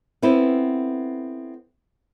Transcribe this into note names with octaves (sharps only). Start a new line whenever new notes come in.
B3 C4 E4 A4 B4